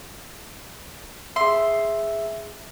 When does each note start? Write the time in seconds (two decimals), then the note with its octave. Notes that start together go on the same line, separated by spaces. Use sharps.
1.36 G#4 E5 C6